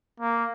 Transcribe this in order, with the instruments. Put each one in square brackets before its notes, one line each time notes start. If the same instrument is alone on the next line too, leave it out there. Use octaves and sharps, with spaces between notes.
[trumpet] A#3